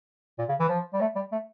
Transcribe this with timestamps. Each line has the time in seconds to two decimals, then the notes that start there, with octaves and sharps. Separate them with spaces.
0.39 A#2
0.49 C#3
0.60 E3
0.69 F3
0.93 G3
1.00 A3
1.16 G3
1.32 A3